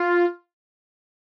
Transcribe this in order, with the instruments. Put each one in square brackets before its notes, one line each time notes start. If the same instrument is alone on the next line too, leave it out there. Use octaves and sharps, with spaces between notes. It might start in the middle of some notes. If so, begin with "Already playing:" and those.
Already playing: [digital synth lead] F4